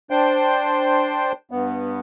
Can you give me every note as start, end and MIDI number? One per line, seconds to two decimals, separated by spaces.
0.11 1.32 62
0.11 1.32 72
0.11 1.32 79
0.11 1.32 84
1.51 2.00 43
1.51 2.00 59